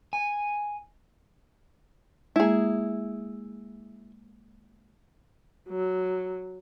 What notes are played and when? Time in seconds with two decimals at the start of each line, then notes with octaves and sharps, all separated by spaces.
0.13 G#5
2.36 G#3 A#3 E4 G#4
5.69 F#3